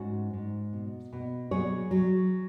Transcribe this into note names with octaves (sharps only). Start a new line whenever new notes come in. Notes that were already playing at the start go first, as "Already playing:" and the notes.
Already playing: G#2 C#4 F#4
G#2
B2
B2
F#3 G#4 C#5
F#3